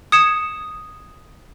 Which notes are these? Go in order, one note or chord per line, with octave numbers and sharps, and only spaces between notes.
D#6 G#6 C#7 E7